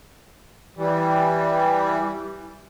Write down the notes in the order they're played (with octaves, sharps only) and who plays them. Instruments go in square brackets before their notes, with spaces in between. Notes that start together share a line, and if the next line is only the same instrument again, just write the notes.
[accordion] E3 G3